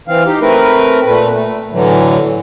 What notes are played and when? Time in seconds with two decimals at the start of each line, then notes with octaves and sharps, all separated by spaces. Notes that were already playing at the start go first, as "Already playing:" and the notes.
0.08 E3 C4 F5
0.26 D#4 G4
0.41 A3 C4 A#4 B4
1.06 A#2 A3 B4
1.33 A3
1.73 A2 D3 E3 F#3